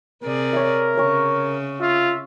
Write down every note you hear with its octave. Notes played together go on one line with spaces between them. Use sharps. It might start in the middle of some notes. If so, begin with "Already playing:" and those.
C3 G#4 A#4 D5
C#5 E5
C#3 C#5 C#6
F4 E5